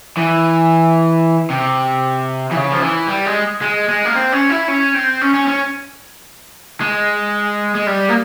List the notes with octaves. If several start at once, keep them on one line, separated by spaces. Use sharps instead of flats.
E3
C3
E3
C#3
F3
E3
G3
G#3
G#3
G#3
A#3
C4
C#4
E4
C#4
C4
C#4
C#4
C#4
G#3
G#3
G3
A#3